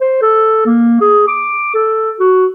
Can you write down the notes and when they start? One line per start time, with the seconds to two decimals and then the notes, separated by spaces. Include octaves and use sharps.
0.01 C5
0.22 A4
0.66 A#3
1.01 G#4
1.28 D6
1.74 A4
2.20 F#4